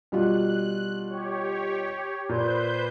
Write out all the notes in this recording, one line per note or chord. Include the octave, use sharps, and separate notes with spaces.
B2 G3 F4 F#6
G4 C#5
A#2 B4 C5 G6